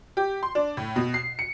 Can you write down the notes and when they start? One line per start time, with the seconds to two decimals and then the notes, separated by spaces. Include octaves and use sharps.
0.17 G4
0.43 C6
0.55 D4
0.77 A2
0.96 B2
1.14 C7
1.39 C#7